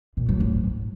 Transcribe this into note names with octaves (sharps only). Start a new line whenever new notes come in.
A#2
F#3
G#2